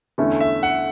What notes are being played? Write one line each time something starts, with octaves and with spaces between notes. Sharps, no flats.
E2 D3 A3 C#4 E4
E5
F#5